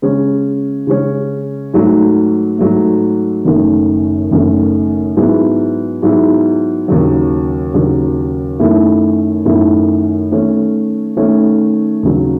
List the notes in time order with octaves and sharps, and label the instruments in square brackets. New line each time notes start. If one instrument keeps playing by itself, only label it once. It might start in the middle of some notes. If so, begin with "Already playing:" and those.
[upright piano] C#3 G#3 C#4
C#3 G#3 C#4
G#2 F#3 A3
G#2 F#3 A3
F#1 F#2 D#3 A3
F#1 F#2 D#3 A3
G#2 F#3 B3 E4 G#4
G#2 F#3 B3 E4 G#4
D#2 C#3 F#3
D#2 C#3 F#3
F#2 D#3 A3 E4
F#2 D#3 A3 E4
D#3 A3 C#4
D#3 A3 C#4
D#2 C#3 F#3